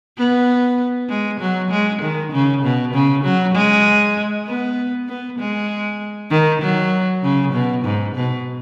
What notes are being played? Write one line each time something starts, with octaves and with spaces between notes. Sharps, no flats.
B3
G#3
F#3
G#3
D#3
C#3
B2
C#3
F#3
G#3
B3
B3
G#3
D#3
F#3
C#3
B2
G#2
B2